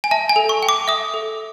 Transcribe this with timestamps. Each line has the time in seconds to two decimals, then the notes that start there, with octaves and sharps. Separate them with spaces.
0.04 G#5
0.11 E5 A5
0.29 G#5
0.36 A4
0.49 C#6
0.63 G5
0.69 D6
0.88 E5 D#6
1.14 A4